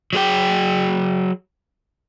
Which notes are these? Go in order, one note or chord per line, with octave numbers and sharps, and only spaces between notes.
F#3 G#4 G5